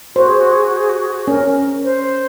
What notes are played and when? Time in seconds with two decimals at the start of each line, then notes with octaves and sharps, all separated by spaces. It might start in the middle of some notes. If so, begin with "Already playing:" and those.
0.15 F#4 C5
0.28 G#4
0.40 F#4
0.53 G#4
0.64 F#4
0.77 G#4
0.89 F#4
1.01 G#4
1.12 F#4
1.27 C#4 A#4
1.84 C5